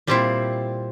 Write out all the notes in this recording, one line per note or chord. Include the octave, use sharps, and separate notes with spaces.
A#2 G3 C4 E4